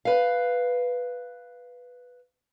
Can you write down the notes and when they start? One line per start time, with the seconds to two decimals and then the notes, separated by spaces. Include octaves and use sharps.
0.05 B4 F5